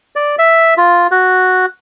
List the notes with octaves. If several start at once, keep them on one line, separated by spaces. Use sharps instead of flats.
D5
E5
F4
F#4